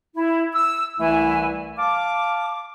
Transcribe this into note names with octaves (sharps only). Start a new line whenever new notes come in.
E4
E6
C2 E3 A3 E4 G#5
F5 A5 D6